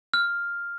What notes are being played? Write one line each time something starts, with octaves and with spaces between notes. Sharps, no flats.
F6